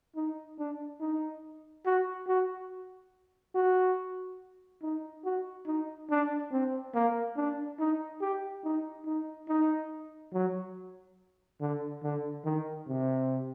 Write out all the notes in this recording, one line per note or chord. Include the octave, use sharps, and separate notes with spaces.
D#4
D4
D#4
F#4
F#4
F#4
D#4
F#4
D#4
D4
C4
A#3
D4
D#4
G4
D#4
D#4
D#4
F#3
D3
D3
D#3
C3